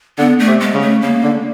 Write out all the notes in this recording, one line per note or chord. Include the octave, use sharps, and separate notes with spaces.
D3 B3
A3
C3
G#3
C#3
A3
C#3 A#3
D3